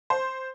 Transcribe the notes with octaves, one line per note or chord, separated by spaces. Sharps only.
C5